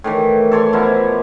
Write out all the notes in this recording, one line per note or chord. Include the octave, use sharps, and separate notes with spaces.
A2 D#3 E3
A4 C#5 D5 C6
B2 F3 E4 A#4